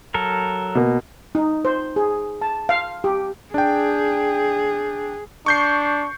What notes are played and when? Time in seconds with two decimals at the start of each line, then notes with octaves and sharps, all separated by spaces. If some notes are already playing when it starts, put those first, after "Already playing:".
0.14 F#3 A4 A#4
0.75 B2 A#3
1.35 D#4
1.65 C5
1.96 G#4
2.41 A5
2.69 F5
3.04 G4
3.54 D4 G#4 G5
5.46 D4 C#6 G6 C7